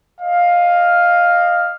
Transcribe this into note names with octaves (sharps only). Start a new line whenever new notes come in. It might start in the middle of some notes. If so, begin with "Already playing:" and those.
D#5 F5